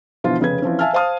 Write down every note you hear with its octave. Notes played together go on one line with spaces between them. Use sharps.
B2 D3 E3 F3 F4
F1 C#3 B4 G#6
E3 F3 C4 C#4
E5 F5 G#5 A5 E6 F6
C5 F5 A5 D#6 F6